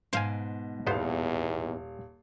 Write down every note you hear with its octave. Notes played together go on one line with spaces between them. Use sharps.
G#2 B2 C5 F5 G#5
D#1 E2 B3 C5 F5